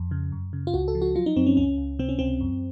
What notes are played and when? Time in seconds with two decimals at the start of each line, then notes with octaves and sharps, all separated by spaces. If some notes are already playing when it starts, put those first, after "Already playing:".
Already playing: F2
0.11 C#3
0.32 F#2
0.53 C#3
0.67 F4
0.74 C#2 F#4
0.88 A4
0.95 F3
1.02 F#4
1.15 F#3 F4
1.26 D#4
1.36 F#2 C4
1.46 C#4
1.57 C#2 C#4
1.78 C#2
1.99 C3 C4
2.09 C#4
2.19 C#2 C4
2.41 F#2